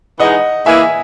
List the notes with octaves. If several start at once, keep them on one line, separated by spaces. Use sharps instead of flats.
E3 G#3 D#4 D#5 F#5
E3 A#3 E4 G#4 E5 G#5